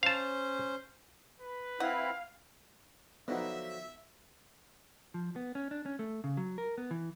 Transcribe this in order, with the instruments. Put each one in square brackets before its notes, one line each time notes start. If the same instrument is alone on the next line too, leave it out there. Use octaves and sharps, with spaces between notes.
[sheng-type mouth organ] C#4 C5 [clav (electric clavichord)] F5 A5
[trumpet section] B4
[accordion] C4 E4 [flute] F5 [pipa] F#5
[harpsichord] D3 F3 F#3 [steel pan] B3 D#4 [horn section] E5
[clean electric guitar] F3
B3
C#4
D4
C#4
A3
C#3
F#3
A#4
B3
E3